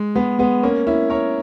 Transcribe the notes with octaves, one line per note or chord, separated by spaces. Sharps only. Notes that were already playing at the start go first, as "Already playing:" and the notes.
Already playing: G#3
G#3 B3
G#3 B3
A#3 C#4
C#4 E4
A#4 C#5